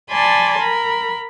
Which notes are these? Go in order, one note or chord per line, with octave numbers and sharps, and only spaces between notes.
D5 G#5 A5 B5 C6
A#4 B5